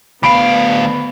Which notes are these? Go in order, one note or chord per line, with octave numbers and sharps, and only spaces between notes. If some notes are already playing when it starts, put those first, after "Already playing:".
D2 B3 F5 B5 D7